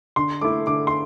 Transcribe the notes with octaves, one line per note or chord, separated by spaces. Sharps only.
D3 C6
A3 E4 D6
D3 D6
C6